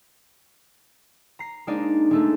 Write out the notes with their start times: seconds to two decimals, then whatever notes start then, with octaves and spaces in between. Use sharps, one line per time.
1.39 A#5 C7
1.67 G#3 A#3 D4 D#4 D5
2.11 G#3 A3 A4